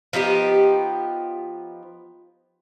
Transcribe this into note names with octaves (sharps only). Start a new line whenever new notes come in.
F3 B3 D#4 G4